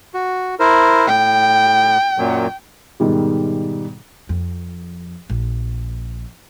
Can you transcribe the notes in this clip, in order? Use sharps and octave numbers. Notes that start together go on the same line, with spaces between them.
F#4
E4 A#4 C5
A2 G5
F#2 A#2 F#3
G#2 B2 D#3 G3
F2
A#1